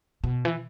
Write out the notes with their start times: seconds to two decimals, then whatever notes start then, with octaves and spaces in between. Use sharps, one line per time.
0.24 B2
0.45 E3